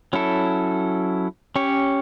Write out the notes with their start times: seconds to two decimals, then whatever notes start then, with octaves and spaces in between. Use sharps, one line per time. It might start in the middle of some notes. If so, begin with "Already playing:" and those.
0.13 F#3 C#4 E4 A4
1.56 C#4 G4 C#5